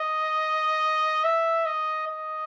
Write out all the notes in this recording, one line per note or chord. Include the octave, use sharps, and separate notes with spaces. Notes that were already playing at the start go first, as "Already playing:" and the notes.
Already playing: D#5
E5
D#5
D#5